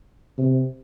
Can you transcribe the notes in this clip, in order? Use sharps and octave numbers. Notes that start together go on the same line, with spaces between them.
C3